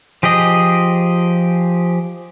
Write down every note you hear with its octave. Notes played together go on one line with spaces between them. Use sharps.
F3 G4 G#4 D#5